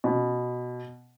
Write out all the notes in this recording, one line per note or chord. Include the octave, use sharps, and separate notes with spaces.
B2